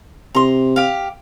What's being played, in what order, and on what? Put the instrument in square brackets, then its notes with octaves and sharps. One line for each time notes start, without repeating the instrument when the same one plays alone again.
[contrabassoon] C3 [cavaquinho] A#5 C6
[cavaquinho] G4 F5